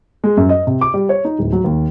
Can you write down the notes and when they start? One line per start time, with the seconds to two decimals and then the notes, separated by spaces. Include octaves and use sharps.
0.24 G#3
0.37 F#2
0.49 D#5
0.67 C3
0.81 D6
0.94 G3
1.09 C#5
1.25 D#4
1.39 D1
1.52 F#3
1.64 D#2